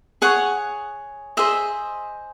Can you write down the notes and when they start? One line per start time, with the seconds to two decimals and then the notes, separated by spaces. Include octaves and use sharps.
0.22 G#4 C#5 F#5
1.37 G#4 C5 D#5 E5